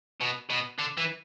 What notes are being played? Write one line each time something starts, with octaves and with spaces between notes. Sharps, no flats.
B2
B2
D3
E3